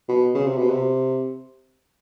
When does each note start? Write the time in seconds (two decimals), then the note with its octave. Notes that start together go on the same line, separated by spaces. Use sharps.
0.08 B2
0.34 C#3
0.46 C3
0.58 B2
0.69 C3